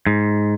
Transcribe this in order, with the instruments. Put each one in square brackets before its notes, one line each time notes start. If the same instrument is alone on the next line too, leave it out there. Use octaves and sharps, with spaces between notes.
[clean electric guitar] G#2